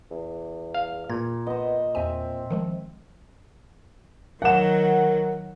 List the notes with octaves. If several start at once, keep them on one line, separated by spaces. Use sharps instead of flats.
E2
F5
A#2 G#6
B3 C5 D#5
E2 C4 E5 G#5
D#3 F3 G#3
D#3 F#3 A#4 F#5 E7